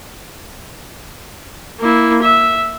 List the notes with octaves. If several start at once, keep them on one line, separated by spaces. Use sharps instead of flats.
A#3 E4
E5